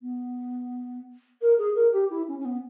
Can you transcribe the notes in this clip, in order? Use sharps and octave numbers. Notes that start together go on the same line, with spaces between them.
B3
A#4
G#4
A#4
G4
E4
C#4
C#4
B3